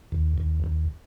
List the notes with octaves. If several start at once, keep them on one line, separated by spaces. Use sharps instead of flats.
D#2
D#2
D#2